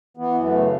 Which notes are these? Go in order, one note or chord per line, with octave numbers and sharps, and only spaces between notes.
E3 B3
F#2
A3
C#3